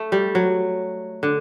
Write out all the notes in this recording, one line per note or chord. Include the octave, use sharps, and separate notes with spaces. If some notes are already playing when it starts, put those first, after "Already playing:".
Already playing: A3
G3
F#3
D3